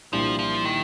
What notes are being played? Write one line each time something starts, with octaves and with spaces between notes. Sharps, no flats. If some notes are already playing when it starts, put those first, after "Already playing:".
C2 A#2 F3 G3 D4
F3
D#3